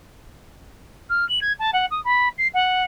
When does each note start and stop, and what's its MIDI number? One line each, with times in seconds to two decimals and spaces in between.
1.09 1.27 89
1.29 1.39 102
1.41 1.52 92
1.59 1.70 81
1.73 1.85 78
1.91 2.02 87
2.04 2.28 83
2.38 2.47 96
2.54 2.83 78